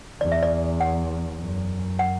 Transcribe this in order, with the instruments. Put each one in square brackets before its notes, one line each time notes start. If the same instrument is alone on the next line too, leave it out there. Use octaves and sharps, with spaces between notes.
[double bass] E2 [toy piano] D5
[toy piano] E5
D5
F#5
[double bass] F#2
[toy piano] F#5